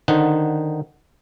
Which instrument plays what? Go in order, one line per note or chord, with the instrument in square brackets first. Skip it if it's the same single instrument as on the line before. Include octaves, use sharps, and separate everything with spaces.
[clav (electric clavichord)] D3 D#3 D#4 C5 F#5